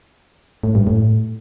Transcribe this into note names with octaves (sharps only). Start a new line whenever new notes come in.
A2
G2
A2